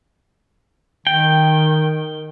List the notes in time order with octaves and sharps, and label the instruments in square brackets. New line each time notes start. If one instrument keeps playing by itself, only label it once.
[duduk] D#3 [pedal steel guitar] G5